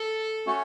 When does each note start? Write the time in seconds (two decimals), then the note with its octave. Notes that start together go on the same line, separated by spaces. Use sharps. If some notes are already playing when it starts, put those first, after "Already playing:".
Already playing: A4
0.46 A3 C#4 F#4 C#5